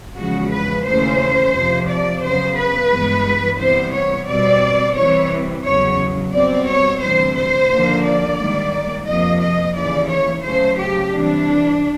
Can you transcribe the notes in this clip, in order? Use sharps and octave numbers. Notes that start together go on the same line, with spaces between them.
E2 C#3 F3 G#3 F#4
B4
D#2 C#3 E3 A3 C#4 C5
F2 C3 F3
D5
C#3 F#3 B3 C5
B4
G2 E3 G#3 B3
C3 E3 G3 B3 C5
C#5
B2 G3 C4 D5
C3 E3 G3 C4 C#5
E2 C#3 F#3 C#5
B2 G3 C4 D5
C#5
D2 C3 E3 G3 C5
C5
D#2 D3 F3 A#3
D5
G#2 D#3 G3 A#3
F2 C3 F3 A#3 D#5
D#5
D#2 C#3 E3 D5
C#5
C#3 F#3 A3 C#4 C5
G4
C3 E3 G3 D4